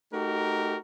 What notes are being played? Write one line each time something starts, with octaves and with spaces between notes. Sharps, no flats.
A3 D#4 F#4 G4 A#4